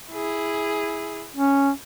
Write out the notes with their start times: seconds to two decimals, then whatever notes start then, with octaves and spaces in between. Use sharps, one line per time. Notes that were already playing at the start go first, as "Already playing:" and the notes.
0.10 E4 G#4
1.36 C#4